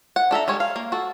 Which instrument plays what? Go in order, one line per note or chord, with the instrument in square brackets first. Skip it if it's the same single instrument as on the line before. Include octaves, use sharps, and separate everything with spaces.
[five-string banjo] F#5
D4 A4 E5 A#5
G3 G#3 C#5
F5
A#3
F#4 A4